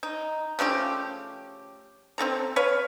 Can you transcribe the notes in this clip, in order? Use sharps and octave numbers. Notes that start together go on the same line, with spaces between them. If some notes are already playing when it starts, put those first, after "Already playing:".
D#4
C#3 F3 A3 G4
C4 F4 A4 A#5
B4 C#5 F5